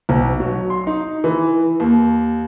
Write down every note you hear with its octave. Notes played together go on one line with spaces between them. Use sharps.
B1
F#3
C6
D#4
E3
D#2